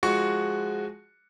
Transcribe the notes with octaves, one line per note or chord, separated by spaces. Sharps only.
F3 G#3 F#4 C#6 C#7